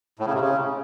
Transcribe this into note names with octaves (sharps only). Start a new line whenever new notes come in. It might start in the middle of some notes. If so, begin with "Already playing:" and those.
A2
C#3
C3
C#3